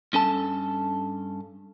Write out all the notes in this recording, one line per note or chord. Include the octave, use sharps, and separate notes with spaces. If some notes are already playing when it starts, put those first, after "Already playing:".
G2 C#4 A4 A5